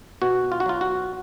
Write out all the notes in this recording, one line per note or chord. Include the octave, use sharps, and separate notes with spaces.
B2 F#4
F4
F#4
F#3 F4
F#4